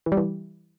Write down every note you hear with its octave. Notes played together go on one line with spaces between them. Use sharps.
E3
G3
E3